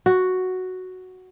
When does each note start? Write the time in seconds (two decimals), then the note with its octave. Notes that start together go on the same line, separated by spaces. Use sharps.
0.06 F#4